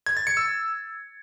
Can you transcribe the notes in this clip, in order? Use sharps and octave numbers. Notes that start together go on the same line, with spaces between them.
G#6
A6
C#7
E6